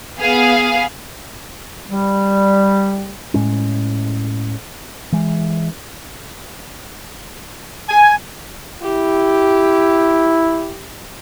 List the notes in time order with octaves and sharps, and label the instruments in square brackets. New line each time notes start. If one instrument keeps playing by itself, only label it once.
[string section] B3 G#4 F5
[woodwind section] G3
[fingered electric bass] A2 G#3 C#4
E3 G#3
[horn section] G#5
[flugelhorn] E4 [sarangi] G4